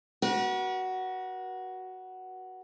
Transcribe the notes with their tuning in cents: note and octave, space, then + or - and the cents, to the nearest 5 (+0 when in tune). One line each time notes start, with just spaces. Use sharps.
F#4 +10 B4 -45